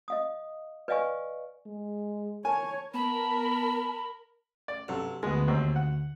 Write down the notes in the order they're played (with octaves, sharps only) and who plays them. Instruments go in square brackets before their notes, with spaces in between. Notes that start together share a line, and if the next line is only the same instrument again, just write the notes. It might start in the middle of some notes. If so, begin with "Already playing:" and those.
[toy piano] D#5 F5 D#6
B4 D5 D#5 F5 G#5 C#6
[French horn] G#3
[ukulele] A#4 A5 [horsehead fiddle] C#5 [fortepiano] G#5
[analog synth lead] B3 [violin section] A#4 [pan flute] A5 [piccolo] B5
[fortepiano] D5
[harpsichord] G2 [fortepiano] C3 F#3 A4
[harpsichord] D2 [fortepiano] G#3 B3
[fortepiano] D#2 C4
F#5